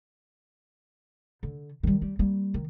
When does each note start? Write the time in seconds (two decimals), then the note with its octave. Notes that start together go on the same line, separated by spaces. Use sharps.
1.43 D3
1.83 D#3 G3
2.02 G3
2.19 G3 A#3
2.54 D#3